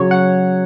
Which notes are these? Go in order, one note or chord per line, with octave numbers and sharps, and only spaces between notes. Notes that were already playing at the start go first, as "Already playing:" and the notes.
Already playing: C#3 F#3 C#5
F#5